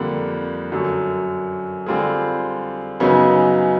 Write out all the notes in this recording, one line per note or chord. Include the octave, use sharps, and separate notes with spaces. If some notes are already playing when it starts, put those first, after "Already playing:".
Already playing: F2 D3 G3 A#3
F#2 D3 F#3
D3 G3 C4 F4 G#4
F#2 C#3 F#3 B3 D#4